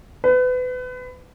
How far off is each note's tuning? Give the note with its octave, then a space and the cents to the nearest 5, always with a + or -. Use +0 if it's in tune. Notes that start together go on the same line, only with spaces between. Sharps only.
B4 +30